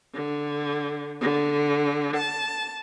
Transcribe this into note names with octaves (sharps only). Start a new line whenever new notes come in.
D3
D3
A5